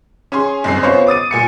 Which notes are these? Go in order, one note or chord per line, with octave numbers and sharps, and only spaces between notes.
C#4 G#4 G#5 C6
G1 F#2 C3 C7
B3 C#4 F4 C5 C#5
D6 D#6 A6 D#7
A#2 G#5 C#7